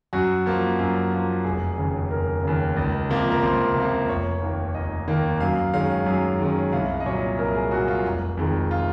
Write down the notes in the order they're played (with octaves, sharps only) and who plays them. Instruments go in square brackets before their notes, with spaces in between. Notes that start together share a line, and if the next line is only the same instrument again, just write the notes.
[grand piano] F#2 F#4
F3 A#3
F#2
F3 A#3
F1 G#4
D#2 C#3
F1 A#4
D#2 C#3
C#2
C3 F3 A#3
A#4
C#2 C5
C3 F3 A#3
F1 C#5
D#2 D#3 A#3
F1 D#5
D#2 D#3 A#3
F#2 F5
D#3 G#3 C#4 F5
F#2
D#3 G#3 C#4
C2 F5
D#5
A#2 F#3 C#5
C2 A#4
G#4
A#2 F#3 F#4
F4
F1
F2 D#3 G#3
F4